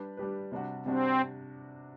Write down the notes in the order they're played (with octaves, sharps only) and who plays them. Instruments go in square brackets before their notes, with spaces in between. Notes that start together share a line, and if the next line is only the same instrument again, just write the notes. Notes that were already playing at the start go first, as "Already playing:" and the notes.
Already playing: [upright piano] G3 D4 G4 B4
G3 D4 G4 B4
C3 G3 D4 F#4
[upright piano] C3 G3 D4 F#4 [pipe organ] C4